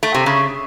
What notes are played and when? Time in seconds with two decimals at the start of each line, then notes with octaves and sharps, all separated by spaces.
0.03 A3
0.14 C3
0.26 C#3